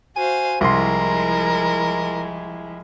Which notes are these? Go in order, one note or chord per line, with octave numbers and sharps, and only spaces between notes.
F#4 C5 F5 G#5
C2 F3 G#3 E4 A#4 C6